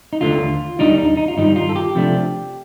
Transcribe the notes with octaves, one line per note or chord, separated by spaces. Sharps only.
D#4
D#2 D3 A3 F4
D#2 D#3 G3 D4 D#4
D#4
D#4
F4
G2 D#3 G3 D#4
F4
A4
G4
C3 F3 A3 D4